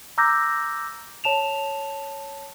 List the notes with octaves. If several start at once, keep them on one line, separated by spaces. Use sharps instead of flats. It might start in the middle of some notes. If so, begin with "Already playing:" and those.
A#5 D6 E6 F#6 G6 A#6
C#5 A5 E7 F7